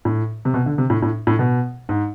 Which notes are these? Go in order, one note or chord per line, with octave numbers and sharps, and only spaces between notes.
A2
C3
B2
D3
C3
A2
A2
A2
B2
G#2